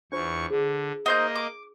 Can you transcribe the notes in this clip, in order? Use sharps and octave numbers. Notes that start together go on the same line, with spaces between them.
E2 D4 F4 C5 C#6
D3 G#4
A#3 D#4 C5 D#5 G6
D6